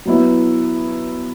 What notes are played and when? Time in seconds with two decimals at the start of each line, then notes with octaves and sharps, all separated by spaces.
0.05 F#3 B3 E4